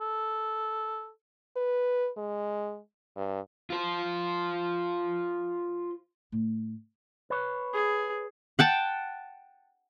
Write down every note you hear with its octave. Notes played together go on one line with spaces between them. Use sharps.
A4
B4
G#3
G2
F4 C5
A2 F4
B4 C#5
G#4
F#5 G5 A5